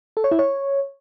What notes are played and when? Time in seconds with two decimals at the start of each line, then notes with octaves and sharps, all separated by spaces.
0.17 A4
0.24 C#5
0.31 E4
0.39 C#5